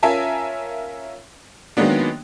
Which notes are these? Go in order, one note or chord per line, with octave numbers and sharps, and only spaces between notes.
C#4 F4 A#4 E5 G#5 A5
D#3 F#3 G#3 A#3 B3 D4